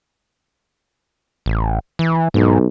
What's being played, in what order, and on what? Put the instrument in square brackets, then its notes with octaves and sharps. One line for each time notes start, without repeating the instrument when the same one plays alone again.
[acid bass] A1
E3
[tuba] B1 [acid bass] G#2